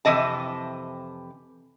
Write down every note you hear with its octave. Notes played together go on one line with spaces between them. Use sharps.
F2 C3 E3 D#5 A5